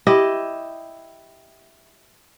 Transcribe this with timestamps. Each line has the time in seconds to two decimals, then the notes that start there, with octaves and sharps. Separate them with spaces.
0.07 E4 G4 D#5